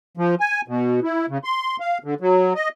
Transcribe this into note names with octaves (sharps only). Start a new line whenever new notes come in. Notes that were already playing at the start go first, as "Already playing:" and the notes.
F3
G#5
B2
E4
C#3
C6
F5
D3
F#3
D#5